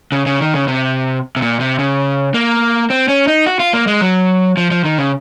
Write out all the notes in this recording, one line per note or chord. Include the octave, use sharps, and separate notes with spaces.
C#3
C#3
D#3
C#3
C3
C3
A#2
C3
C#3
A#3
C4
C#4
D#4
F#4
F4
A#3
G#3
F#3
F3
F3
D#3
C#3